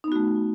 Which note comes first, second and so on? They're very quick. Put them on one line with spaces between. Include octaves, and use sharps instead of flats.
D#4 B3 F#4 A3